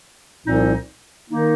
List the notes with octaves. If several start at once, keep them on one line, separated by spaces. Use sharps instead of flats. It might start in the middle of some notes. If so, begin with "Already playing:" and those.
C2 A#2 F3 C4 D#4
D#3 A#3 D#4